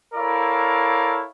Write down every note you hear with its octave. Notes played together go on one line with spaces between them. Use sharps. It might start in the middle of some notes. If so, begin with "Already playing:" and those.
E4 A4 A#4 C#5 D5 F5